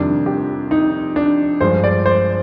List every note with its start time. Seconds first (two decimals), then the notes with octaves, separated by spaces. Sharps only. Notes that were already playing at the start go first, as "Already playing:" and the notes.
Already playing: F2 C3 D#3 G3 D4
0.26 G4
0.71 D#4
1.16 D4
1.61 G2 F3 G#3 C5
1.84 D5
2.06 C5